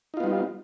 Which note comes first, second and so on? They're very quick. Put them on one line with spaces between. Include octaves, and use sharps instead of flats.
D#4 F4 B3 G3